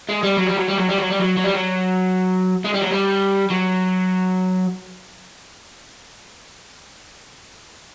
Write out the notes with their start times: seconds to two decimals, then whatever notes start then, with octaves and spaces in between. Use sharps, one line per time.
0.09 G#3
0.23 G3
0.37 F#3
0.47 G3
0.57 F#3
0.68 G3
0.78 F#3
0.89 G3
0.98 F#3
1.10 G3
1.19 F#3
1.37 F#3
1.44 G3
1.54 F#3
2.64 G#3
2.74 G3
2.82 F#3
2.91 G3
3.50 F#3